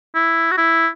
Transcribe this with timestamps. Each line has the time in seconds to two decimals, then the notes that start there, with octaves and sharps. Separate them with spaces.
0.15 E4
0.51 F#4
0.58 E4